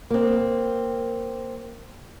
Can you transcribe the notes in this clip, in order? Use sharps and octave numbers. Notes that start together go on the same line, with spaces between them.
A#3 C4